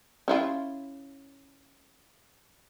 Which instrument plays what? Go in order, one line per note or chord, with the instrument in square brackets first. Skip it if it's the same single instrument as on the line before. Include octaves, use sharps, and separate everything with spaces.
[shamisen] C#4 E4 F4